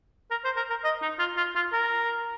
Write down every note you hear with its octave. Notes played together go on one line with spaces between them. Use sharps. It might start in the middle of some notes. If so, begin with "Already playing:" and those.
A#4
C5
A#4
A#4
D#5
D#4
F4
F4
F4
A#4